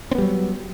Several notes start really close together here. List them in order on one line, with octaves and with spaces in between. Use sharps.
C4 B3 G3 F#3